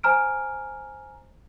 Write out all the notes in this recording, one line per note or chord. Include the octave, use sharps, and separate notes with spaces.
C5 G#5 A#5 F6 D7